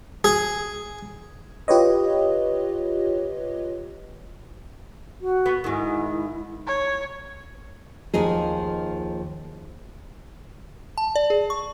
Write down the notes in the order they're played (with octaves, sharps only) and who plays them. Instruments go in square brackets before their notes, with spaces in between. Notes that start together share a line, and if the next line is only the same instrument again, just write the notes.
[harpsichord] G#4
[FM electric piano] F4 G4 B4 C#5 D#5
[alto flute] F#4
[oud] B3
[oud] G#2 D#3 [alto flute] E4
[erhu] C#5
[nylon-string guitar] D#2 F3 D#4 G#4
[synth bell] A5
D5
G#4
C#6